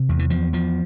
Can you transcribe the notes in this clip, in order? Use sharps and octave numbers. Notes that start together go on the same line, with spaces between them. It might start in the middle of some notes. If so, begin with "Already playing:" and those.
Already playing: C3
E2
E3
E2 F3
E2 F3